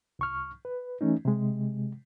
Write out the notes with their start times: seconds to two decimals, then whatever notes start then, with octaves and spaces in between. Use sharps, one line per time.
0.19 C2 C#6 F6
0.65 B4
1.01 E3 A3 C#4 D#4
1.25 C3 G#3